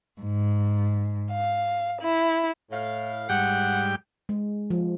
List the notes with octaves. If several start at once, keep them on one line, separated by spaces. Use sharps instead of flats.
G#2
F5
E4
A2 F5
G#2 G3 F#5 G5
G#3
F3